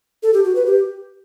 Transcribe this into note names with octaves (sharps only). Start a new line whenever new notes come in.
A4
G4
F#4
B4
G4